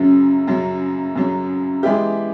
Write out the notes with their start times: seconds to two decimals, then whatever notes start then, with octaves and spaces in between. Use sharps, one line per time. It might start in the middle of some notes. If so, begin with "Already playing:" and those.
Already playing: F#2 C#3 F#3
0.47 F#2 C#3 F#3
1.15 F#2 C#3 F#3
1.83 E3 G#3 B3 E4 G4